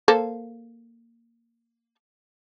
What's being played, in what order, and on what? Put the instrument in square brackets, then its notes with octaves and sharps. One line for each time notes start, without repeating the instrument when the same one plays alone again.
[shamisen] A#3 A4 C5